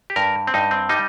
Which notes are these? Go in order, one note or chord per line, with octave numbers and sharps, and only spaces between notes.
G4
G2 A#4
C4
G2 D#4
C4
G3 D#4